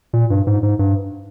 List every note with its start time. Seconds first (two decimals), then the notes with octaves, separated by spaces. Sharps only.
0.13 A#2
0.30 G2
0.47 G#2
0.63 G#2
0.79 G2